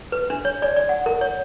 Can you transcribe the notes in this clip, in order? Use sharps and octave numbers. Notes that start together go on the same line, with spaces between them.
B4
D4
C#5
D5
D5
F#5
A#4
C#5